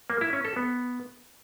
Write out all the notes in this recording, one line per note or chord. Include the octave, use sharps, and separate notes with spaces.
A#3
E4
C#4
A4
B3